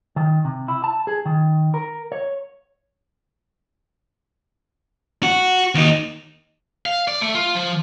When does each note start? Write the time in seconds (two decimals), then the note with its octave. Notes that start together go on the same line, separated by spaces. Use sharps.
0.16 D#3
0.45 C3
0.68 E4
0.84 A5
1.07 G#4
1.26 D#3
1.74 A#4
2.12 C#5
5.23 F#4
5.75 D#2 D#4
6.86 F5
7.08 D5
7.21 A3
7.35 F4
7.55 F3